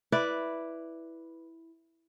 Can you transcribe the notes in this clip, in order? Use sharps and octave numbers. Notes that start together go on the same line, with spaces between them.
E4 B4 D5